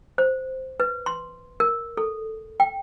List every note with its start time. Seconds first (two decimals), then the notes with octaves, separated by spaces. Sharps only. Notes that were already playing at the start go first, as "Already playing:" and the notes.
0.18 C5
0.80 B4
1.06 C6
1.60 A#4
1.97 A4
2.60 G5